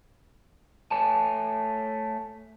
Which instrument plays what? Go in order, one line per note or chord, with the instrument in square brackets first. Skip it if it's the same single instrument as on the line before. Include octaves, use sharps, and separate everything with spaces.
[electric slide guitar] A3 C#5 G#5 A5